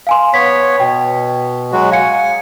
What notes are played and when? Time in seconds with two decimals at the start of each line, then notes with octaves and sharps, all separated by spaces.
0.07 F5 G#5 C6
0.34 B3 C#5 B6
0.80 B2 G5
1.73 F#3 G#3 F#4
1.92 F5 G#5 C#7